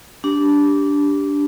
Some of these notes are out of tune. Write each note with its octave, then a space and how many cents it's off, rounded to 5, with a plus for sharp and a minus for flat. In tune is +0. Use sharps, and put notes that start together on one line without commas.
D4 -15 G4 +0